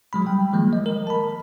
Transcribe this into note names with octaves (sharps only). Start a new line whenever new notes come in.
F#3 G#3 B5
G3 G5
D#3 F3 G#3 A#3
D#5
A#4
A5 B5